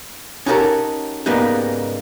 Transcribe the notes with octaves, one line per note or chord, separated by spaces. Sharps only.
C#4 D#4 F#4 G4 A4 A#4
G#2 C#3 G3 A#3 B3 D#4